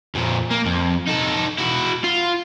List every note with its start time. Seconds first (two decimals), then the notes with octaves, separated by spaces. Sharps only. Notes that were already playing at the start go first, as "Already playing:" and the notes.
0.15 F2 A#2
0.51 A#3
0.66 F2
1.07 D#4 A4
1.58 E4 F#4
2.04 F4